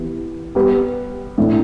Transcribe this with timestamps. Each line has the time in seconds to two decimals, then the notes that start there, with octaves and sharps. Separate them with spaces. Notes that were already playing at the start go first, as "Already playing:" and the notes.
Already playing: E3 B3 G4 B4
0.55 G3 B3 G4 B4
1.38 A2 E3 A3 D4 A4